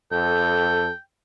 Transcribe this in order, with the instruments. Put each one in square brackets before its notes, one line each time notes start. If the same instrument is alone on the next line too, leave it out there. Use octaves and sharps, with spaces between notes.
[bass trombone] F2 [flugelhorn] A4 [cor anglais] G5